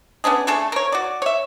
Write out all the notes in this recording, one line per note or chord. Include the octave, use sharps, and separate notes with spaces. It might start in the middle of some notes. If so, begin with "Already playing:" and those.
B3 C#4 D4 G#4
A3 D4 G#4 A4
A#4 C#5
F#4 D5
C#5 E5